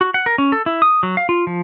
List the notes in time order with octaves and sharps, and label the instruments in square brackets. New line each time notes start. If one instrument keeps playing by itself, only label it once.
[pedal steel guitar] F#4
F#5
A#4
C#4
A4
E4
D#6
F#3
F5
F4
F3